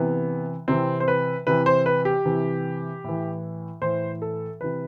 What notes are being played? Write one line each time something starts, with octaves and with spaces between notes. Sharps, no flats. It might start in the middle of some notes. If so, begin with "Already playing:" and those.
Already playing: C3 E3 B3
C3 E3 C4
C5
B4
C3 E3 B4
C5
B4
G4
C3 E3
A2 E3
A2 E3 C5
A4
C3 E3 B4